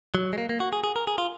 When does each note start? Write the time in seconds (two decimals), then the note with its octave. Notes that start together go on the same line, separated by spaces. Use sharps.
0.15 F#3
0.33 G#3
0.38 A#3
0.49 A#3
0.60 F#4
0.73 G#4
0.84 G#4
0.96 A#4
1.07 G#4
1.18 F4